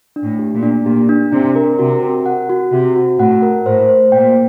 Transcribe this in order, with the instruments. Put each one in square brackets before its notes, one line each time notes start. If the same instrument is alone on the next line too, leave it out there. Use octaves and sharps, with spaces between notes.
[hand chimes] D4
[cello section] A2
[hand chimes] G4
[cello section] A#2
[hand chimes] D4
[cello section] A#2 [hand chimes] G4
[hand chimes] D4
[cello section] C3 [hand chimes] D4
[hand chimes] A#4
[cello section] C3 [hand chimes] F#4
[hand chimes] A#4
F#5
F#4
[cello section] C3 [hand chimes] F#4
[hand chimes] F#4
[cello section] A2 [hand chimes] F#5
[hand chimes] A#4
[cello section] A2 [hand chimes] C5
[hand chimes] C5
[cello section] A#2 [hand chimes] G5